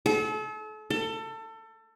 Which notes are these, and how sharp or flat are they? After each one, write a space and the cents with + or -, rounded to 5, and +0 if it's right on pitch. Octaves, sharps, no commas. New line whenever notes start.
A4 -40
A4 +25